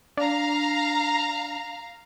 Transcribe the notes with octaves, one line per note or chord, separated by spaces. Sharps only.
D4 F5 A#5